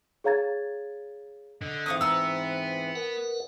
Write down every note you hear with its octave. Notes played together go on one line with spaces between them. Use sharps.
G#4 C#5 F5 A#5 G#6 A6
D3 D#5
G#2 E3 C4 F5 C#6 D#6
B3 A#5 E6
A#4 B4 F#5